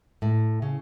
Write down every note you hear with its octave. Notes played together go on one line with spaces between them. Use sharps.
A2
C#3